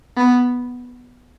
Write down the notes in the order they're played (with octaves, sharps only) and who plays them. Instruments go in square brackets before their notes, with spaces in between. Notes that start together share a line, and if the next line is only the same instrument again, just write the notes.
[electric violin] B3